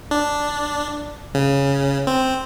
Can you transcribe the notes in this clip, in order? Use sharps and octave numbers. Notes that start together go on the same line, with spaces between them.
D4
C#3
C4